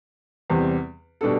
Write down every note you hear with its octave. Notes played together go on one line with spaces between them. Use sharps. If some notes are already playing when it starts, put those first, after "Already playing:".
E2 C3 G3 C4
B2 G3 D4 A4